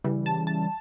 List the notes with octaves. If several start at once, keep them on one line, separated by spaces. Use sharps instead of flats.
C#3 E3 G3
A5
A5